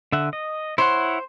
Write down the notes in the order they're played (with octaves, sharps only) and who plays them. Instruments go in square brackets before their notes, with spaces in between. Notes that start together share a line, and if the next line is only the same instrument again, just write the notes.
[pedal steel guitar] D3 E5 F#5
D#5
[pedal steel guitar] E4 C#5 F#5 [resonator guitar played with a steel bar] C5